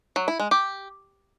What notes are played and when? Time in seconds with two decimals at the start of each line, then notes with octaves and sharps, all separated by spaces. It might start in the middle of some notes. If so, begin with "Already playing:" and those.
0.16 F#3
0.28 E4
0.40 G#3
0.51 G4